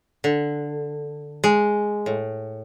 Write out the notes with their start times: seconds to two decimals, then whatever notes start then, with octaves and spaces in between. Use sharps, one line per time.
0.24 D3
1.44 G#3
2.06 A2